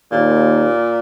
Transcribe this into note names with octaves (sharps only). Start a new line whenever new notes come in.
D#2 A#2